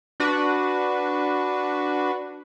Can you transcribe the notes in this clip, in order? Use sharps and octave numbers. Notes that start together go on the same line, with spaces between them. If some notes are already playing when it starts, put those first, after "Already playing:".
D4 F#4 B4